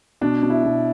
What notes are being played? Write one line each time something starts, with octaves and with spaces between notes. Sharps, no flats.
B2 D4
B2
E4
B2